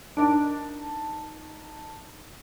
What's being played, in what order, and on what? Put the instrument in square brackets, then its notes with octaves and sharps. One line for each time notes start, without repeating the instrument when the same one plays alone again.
[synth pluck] D4 [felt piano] D#4 A#4 A5